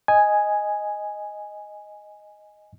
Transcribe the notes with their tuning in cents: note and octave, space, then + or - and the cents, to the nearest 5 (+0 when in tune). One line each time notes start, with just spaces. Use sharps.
D#5 +0 G#5 +0